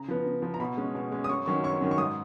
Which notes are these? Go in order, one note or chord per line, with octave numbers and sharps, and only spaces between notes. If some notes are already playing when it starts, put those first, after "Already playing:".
Already playing: C#3 A#5
F3 B3
C#3
F3 B3
A#5
B2 B5
G#3 C#4
B2
G#3 C#4
D#6
F#2 C#6
D#3 F#3 C#4 C#6
F#2 C#6
D#3 F#3 C#4
C#6
G#2 D#6